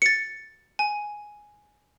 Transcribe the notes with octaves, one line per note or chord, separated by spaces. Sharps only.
A6 C#7
G#5